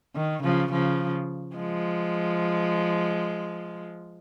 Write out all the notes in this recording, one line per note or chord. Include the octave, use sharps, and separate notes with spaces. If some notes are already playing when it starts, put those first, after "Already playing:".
D#3
C#3 F3
C#3 F3
F3 G#3